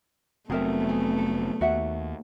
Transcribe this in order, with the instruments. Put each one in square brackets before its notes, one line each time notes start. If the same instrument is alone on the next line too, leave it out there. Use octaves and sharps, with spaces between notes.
[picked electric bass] F1 F#3 C4 [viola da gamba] A3 B3 [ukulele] G#4 A#4 E5
[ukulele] G#4
A4
[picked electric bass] D#2 [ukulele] F#4 E5 F#5